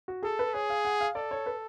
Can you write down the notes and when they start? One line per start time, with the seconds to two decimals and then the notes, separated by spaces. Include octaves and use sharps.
0.08 F#4
0.23 G#4 A4
0.39 B4
0.54 G#4 C#5
0.70 F5
0.85 F#5
1.01 F5
1.15 A4 D5
1.31 C#5
1.46 B4